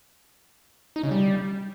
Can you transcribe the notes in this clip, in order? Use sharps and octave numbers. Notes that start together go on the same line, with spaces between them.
D#4
C#3
G3